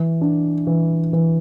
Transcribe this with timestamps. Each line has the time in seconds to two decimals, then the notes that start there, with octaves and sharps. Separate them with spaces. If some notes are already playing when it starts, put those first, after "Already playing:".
Already playing: E3
0.21 D4
0.67 E3
1.13 E3